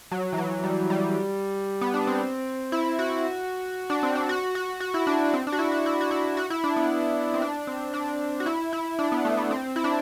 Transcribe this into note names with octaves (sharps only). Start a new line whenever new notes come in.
F#3
E3
F#3
G3
G3
B3
D4
C4
E4
F#4
D4
C4
D4
F#4
F#4
F#4
E4
D4
C4
D4
F#4
E4
F#4
E4
F#4
E4
F#4
E4
D4
B3
C4
D4
C4
D4
F#4
E4
E4
D4
B3
A3
B3
C4
E4
D4